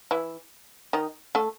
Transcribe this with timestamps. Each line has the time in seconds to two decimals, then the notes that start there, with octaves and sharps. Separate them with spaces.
0.11 E3 E4
0.93 D#3 D#4
1.35 A3 A4